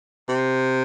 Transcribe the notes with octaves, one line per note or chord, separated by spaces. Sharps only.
C3